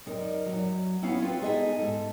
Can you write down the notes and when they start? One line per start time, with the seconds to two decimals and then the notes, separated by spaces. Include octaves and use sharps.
0.06 F#2 D#4 A#4 D5
0.46 F#2 F#3
1.02 B3 C#4 E4 C#5 F5
1.22 C4 F4 F#4 B4
1.42 D#4 G#4 A4 D#5 E5 G#5
1.79 G#2 A4